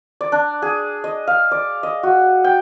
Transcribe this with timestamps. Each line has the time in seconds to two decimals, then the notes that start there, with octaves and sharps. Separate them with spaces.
0.21 D5
0.32 D4
0.62 G#4
1.04 D#5
1.27 F5
1.51 D5
1.83 D#5
2.03 F#4
2.44 G5